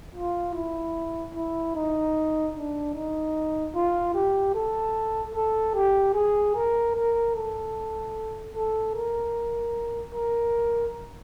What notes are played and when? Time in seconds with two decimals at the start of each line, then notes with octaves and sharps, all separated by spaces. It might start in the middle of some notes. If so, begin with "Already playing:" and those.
0.14 F4
0.54 E4
1.34 E4
1.75 D#4
2.55 D4
2.94 D#4
3.75 F4
4.14 G4
4.54 A4
5.35 A4
5.75 G4
6.14 G#4
6.55 A#4
6.95 A#4
7.35 A4
8.55 A4
8.95 A#4
10.14 A#4